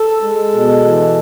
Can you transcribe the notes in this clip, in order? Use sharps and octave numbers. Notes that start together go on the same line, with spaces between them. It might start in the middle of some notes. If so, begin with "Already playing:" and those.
Already playing: A4
G#3
B2
E3